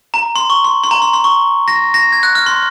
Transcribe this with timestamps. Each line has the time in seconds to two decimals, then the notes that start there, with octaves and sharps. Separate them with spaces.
0.14 A#5
0.36 C6
0.50 C#6
0.64 C6
0.84 C6
0.91 A#5
1.02 C6
1.13 C6
1.24 C#6
1.68 A#6
1.94 A#6
2.13 G#6
2.23 F#6
2.35 F6
2.46 C6